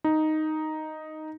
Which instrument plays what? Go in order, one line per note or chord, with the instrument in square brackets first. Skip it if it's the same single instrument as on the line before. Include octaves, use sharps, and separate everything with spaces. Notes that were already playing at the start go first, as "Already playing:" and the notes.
[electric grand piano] D#4